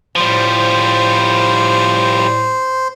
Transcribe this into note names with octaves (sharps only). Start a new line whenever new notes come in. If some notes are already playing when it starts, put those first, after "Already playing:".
A2 F3 G3 C5